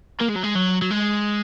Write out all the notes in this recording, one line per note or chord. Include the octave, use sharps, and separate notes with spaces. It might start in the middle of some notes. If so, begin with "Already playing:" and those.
A#3
G#3
F#3
G#3
F#3
F#3
G#3